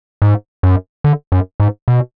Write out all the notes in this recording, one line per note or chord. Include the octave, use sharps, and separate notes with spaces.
G#2
F#2
D3
F#2
G#2
B2